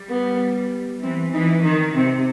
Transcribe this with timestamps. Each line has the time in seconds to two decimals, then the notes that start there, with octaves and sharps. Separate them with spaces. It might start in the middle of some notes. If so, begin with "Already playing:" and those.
Already playing: G3
0.09 B3
1.02 E3 C4
1.33 E3 D#4
1.64 D#3 D#4
1.95 C3 C4